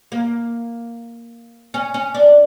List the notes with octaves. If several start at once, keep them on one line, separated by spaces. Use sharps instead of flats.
A#3
C#4
C#4
D4